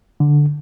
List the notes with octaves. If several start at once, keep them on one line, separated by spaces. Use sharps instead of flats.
D3